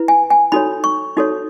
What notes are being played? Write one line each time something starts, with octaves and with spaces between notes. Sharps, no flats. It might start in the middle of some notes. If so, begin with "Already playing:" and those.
Already playing: E4 B4
G#5
G#5
D#4 F#4 A4 C#5 B5
C#6
D#4 F#4 A4 C#5